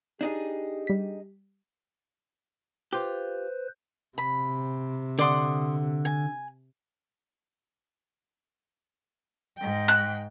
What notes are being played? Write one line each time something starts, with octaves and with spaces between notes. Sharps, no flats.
D4 D#4 G4 G#4
G3 B6
F4 G4 B4 C5
C3 B5
D3 D5 F#5 C6 D#6
G#5
G#2 G5
F#6